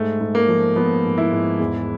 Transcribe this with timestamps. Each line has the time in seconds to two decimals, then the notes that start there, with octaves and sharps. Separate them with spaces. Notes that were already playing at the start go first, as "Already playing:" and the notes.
Already playing: G#2 A3
0.21 G#2
0.35 A#3
0.48 F3
0.76 F3 B3
1.04 G#2
1.18 E4
1.32 G#2
1.60 E2